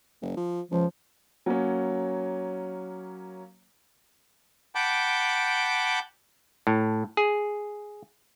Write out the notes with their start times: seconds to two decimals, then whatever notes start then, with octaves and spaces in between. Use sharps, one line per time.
0.22 F#1
0.37 F3
0.71 C#2 F3
1.46 F#3 A#3 C#4
4.75 F#5 G5 A5 B5 D6 G6
6.67 A2
7.17 G#4